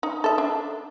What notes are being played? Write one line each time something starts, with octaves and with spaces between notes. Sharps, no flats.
D#4
A4 E5
D4